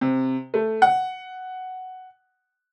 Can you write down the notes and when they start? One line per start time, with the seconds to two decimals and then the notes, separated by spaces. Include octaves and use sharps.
0.01 C3
0.54 A3
0.82 F#5